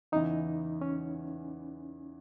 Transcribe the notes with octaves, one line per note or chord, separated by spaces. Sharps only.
E2 C#3 E3 D#4
C#4